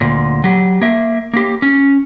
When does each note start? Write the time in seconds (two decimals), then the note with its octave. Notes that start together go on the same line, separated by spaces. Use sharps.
0.01 D2 A#2
0.44 F#3 G4
0.82 A#3 E5
1.34 A#3 G4
1.62 C#4